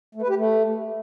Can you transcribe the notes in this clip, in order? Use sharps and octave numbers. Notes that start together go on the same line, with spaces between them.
A3
B4
G4
A3